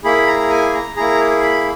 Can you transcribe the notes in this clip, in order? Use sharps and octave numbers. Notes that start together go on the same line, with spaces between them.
A#3 E4 G#4 B5
A#5
G#5
A#5
A#3 E4 G#4 A#5
B5